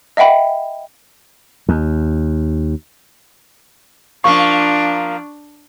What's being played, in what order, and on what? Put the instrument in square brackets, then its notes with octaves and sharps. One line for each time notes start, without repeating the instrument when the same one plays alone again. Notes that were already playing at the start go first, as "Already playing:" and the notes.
[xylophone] D#5 E5 F#5 G5 B5
[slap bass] D#2
[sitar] F3 A#3 [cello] D4 [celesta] C#6